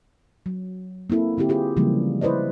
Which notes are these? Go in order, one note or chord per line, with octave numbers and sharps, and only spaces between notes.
F#3
A#3 C4 E4 A4
D3 C4 E4 G4
F4 G4 G#4
C#3 E3 F3 G3 G#3 A#3
E4 B4 C5 D5 D#5